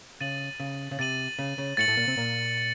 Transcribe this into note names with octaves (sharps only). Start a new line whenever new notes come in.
C#3 A6 D#7 F#7
C#3
C#3
C3 A6 D#7 F#7
C#3
C#3
A2 A3 A6 C#7 F#7
A2 A3
A#2 A#3
C3 C4
A#2 A#3